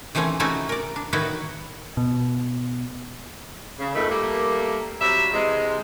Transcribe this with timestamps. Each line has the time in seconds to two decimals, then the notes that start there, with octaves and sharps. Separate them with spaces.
0.15 D#3 E3 A3 C4 C#4
0.40 C3 A3 C#4 D#4 E4 F#4
0.69 A#4 D5
0.96 D4
1.13 A2 D#3 D#4 E4 F#4 B4
1.97 B2
3.79 C#3
3.95 F2 G#2 D#3 A3 B4
4.10 G3 A3 A#3
5.01 C3 F#3 G3 E5
5.33 C3 E3 G#3